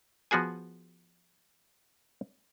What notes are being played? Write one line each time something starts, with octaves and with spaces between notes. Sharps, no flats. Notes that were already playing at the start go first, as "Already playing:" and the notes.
F3 B3 F#4 G#4 G#5